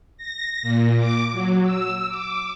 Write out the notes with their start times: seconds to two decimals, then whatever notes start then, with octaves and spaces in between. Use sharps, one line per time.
0.17 A#6
0.62 A#2
0.97 D6
1.33 F#3
1.62 E6
2.09 D6